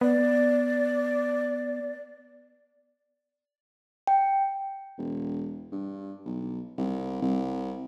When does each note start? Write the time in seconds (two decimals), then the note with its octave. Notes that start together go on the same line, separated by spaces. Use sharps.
0.01 B3 D5
4.07 G5
4.98 E1
5.72 G2
6.26 B1
6.78 C2
7.22 C2